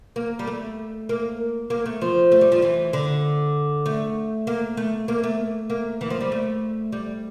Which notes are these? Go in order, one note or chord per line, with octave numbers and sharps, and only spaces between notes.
A#3
G3
A3
A#3
A#3
A3
F3
A3
G3
F3
E3
D3
A3
A#3
A3
A#3
A3
A#3
E3
F3
G3
A3
G3